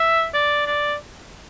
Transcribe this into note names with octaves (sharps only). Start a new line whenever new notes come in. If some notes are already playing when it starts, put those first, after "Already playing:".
Already playing: E5
D5
D5